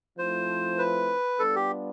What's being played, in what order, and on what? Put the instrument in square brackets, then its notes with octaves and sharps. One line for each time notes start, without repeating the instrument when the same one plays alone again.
[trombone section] F3 A3 C4 E4 [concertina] C5
[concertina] B4
[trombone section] G3 B3 D4 F4 [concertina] A4
[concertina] G4